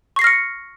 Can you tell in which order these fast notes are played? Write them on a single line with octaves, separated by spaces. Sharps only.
C#6 C7 A#6 F6 C#7